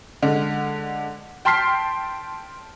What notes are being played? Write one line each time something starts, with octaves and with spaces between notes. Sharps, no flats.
D3 G#3
G5 A5 C6 F6 B6 C7